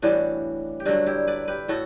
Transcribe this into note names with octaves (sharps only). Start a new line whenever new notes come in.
A2 E3 G3 D4 F#4
G4
G2 D3 F#3 D4 F#4
E4 G4
B4 D5
G4 B4
A2 F#4 A4